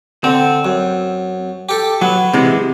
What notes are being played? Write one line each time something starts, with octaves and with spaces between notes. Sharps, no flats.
D3 C4
F#2
G4 A4
F#3 B3
C3 E3 G#3